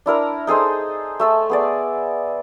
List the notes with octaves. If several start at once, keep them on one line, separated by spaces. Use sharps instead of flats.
D4 E4 A#4 A#5
D#4 G#4 A4 C5
A3 E5 A5
B3 G#4 D5